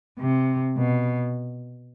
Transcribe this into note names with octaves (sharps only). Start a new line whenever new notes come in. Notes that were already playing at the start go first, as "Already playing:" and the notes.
C3
B2